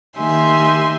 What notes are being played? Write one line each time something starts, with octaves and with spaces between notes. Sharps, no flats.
D#3 A#3 G4 E5 G#5 C6